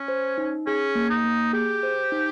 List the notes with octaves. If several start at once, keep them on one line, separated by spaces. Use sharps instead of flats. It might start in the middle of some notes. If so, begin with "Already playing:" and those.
Already playing: C#4
C5
D#4
C#4 G#4
A#3
D#4
A#3
G4 G#4
C5
D#4